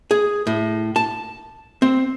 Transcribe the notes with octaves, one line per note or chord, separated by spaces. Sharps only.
G#4
A2
A5
C4